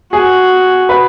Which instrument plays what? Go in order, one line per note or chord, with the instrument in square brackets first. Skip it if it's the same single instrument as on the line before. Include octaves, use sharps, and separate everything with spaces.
[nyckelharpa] F#4 [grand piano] G#4
[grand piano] B4